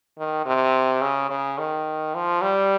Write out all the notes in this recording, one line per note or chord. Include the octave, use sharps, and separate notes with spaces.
D#3
C3
C#3
C#3
D#3
F3
G3